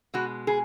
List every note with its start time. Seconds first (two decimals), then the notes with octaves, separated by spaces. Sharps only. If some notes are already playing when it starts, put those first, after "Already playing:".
0.14 B2 G#3 F#4
0.47 G#4